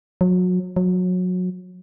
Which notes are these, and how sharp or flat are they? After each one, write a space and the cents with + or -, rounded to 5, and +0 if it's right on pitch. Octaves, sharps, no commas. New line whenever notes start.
F#3 -30
F#3 -25